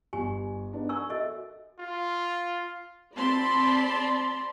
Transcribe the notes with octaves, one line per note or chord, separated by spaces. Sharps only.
G1 G4 G#5
B3 D4 D#4
A#4 G#5 C#6 E6
F#4 A4 D#5 E5
F4
C4 D5 A5 B5 C6